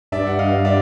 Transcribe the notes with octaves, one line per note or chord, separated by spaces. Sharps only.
G2 D5 E5
F#5
D#5 F5
D5 E5